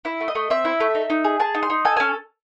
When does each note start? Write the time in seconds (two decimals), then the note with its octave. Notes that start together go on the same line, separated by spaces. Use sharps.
0.05 E4 E5
0.21 A3
0.28 D#5
0.35 A3
0.50 C4 E5
0.65 E4
0.80 A3
0.95 D#4
1.10 D#4
1.24 G#4
1.40 G#4 A5
1.55 D#4
1.63 C6
1.70 D#4
1.85 A4 G#5
1.97 C#4 G#5